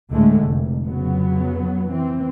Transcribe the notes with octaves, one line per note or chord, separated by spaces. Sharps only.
D2 A2 D3 G#3 A3
F1
F2 C#3 F#3 B3
E3 C4